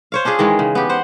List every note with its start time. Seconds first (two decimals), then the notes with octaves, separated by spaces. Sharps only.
0.12 C5 C#5 F5
0.25 C#4 D4 F4 G#4
0.39 D#3 E3 G#3
0.59 C#3
0.75 B3 G4
0.89 C5 F#5